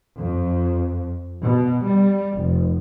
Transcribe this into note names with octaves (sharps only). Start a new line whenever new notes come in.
F2
B2
G3
F1